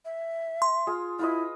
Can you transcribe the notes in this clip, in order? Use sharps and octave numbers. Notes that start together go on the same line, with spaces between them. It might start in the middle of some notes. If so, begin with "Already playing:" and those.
E5
C6
F4 G#4 F5
E4 F4 B4 D#5